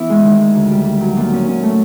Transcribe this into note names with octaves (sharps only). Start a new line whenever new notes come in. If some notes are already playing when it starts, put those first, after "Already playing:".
Already playing: E3 B3 E4
G#3
D#3
G#3
D2
G3
G3
F#3
A#2
C#4
C#4
A3